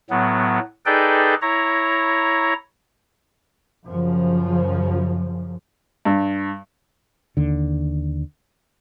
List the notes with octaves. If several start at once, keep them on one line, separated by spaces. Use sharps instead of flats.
A2 F#3 B3
D#4 G#4 A4 B4 D5 G5
E4 C#5 A#5
F#2 C#3 F3
G2
D#2 D3